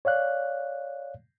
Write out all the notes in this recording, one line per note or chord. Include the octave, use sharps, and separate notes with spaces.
C#5 D5 F5 F#6